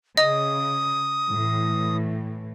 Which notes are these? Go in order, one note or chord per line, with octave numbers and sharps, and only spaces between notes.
C#3 D#5 D#6
A2 E3